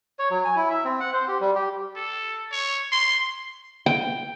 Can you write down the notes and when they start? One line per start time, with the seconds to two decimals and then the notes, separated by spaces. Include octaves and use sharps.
0.19 C#5
0.31 F#3
0.45 G#5
0.56 E4
0.70 E5
0.85 C4
1.00 F#5
1.14 C5
1.28 G4
1.41 G3
1.55 G4
1.96 A4
2.52 C#5
2.92 C6
3.86 G5